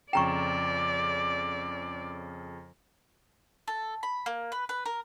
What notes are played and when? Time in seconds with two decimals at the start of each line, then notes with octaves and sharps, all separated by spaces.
0.13 F2 C#3 D5 G5 A#5 C#6 E7
3.68 A4
4.03 B5
4.26 A#3
4.52 B4
4.69 B4
4.86 A#4